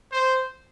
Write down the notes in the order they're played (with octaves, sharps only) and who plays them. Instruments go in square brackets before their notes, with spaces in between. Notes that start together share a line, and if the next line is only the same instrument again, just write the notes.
[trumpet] C5